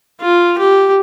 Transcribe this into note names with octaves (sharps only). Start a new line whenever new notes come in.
F4
G4